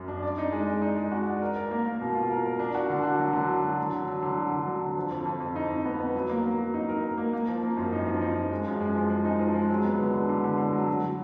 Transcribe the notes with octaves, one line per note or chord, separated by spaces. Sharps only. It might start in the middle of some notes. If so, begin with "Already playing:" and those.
Already playing: F#2
D4
D5
D#4
G#3
D5
D#4
G#3
F#4
D5
A#4
A#4
A#3
A#3
B2
F4
A#4
A#4
D4
F#4
D3
F#4
F#3
D3
F#4
F#3
D3
D3
F#3
D3
F#3
D3
F#3
D3
F3
F2
F2
F2
D#4
F2
B3
B3
F#3
A#3
A#3
F#3
D#4
A#4
A#4
A#3
A#3
F3
A#3
F#2
D#4
F3
D#4
F3
G#3
F#2
G#3
F3
G#3
D#4
F3
G#3
F#3
B3
D3
D3
D3
D3
D3
F#3
F#3
F#3